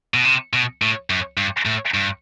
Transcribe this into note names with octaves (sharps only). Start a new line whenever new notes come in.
B2
C3
B2
A2
F#2
G2
A2
G2